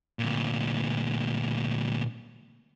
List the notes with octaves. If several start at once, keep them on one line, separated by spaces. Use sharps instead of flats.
D2 A#2